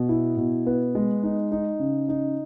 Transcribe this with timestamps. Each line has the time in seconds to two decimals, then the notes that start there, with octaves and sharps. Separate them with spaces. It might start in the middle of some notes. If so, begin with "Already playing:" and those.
Already playing: B2
0.09 E4
0.37 B2
0.66 B3
0.95 G#3
1.23 D#4
1.52 D#4
1.80 C#3
2.09 D#4